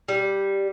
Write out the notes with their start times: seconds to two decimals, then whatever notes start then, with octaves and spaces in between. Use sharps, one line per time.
0.09 G3